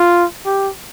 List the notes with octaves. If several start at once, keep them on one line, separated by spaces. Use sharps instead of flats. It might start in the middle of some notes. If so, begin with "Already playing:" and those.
Already playing: F4
G4